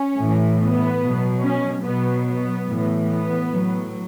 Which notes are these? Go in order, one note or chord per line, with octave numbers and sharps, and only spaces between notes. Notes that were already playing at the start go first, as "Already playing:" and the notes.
Already playing: C#4
A2 E3
B3
B2 F#3
C#4
B2 F#3 B3
B3
A2 E3
B3
A2 F#3